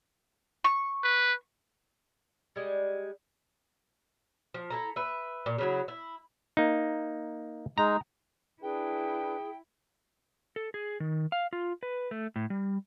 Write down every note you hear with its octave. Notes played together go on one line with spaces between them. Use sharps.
C#6
B4
G3 G#3
F3
E4 A4 A#5
B4 E5
A#2
C#3 F#3 E4
E4
A#3 D#4
G#3 D#4 A#5
D4 E4 G#4 B4 G5
A4
G#4
D#3
F5
F4
B4
A3
A2
G3